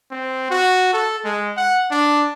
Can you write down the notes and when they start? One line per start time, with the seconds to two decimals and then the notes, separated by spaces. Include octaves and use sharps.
0.11 C4
0.50 F#4
0.93 A4
1.24 G#3
1.56 F#5
1.91 D4